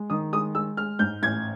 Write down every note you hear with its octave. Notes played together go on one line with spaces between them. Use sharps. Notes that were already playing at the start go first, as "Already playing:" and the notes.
Already playing: G#3
D#3 D#6
G#3 D#6
G#3 E6
G#3 F6
G#2 G6
A1 G#6